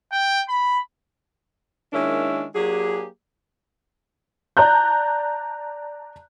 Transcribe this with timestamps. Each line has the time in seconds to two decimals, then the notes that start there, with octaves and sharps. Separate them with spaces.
0.12 G5
0.49 B5
1.93 D#3 G#3 A#3 C#4 D4 E4
2.55 F#3 A#3 D4 G4 G#4
4.57 D5 A5 A#5 F#6 G6